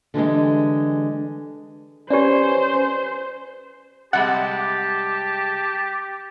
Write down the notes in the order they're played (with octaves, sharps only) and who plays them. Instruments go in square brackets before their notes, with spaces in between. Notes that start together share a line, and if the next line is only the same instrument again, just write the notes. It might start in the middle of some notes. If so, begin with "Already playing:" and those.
[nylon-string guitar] D3 E3 G3 G#3
[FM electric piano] C#4 B4 G#5 [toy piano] G4 D5 [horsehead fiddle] C5
[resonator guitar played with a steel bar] C3 G3 G#3 [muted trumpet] G4 [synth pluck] F#5 [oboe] A5